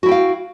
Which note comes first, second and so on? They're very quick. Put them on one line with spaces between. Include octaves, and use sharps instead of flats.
F#4 E4 G5 F5